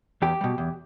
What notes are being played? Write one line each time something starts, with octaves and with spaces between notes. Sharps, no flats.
E2 G4
B2 G3
E2